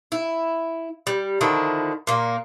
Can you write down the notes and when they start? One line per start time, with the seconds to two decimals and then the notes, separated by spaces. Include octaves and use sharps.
0.12 E4
1.07 G3
1.41 D3 D#3 F3 E4
2.07 A#2 A#3